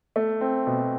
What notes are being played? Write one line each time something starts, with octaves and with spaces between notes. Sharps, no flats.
A3
C4
B2